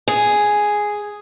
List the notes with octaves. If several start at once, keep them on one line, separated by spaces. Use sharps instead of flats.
G#4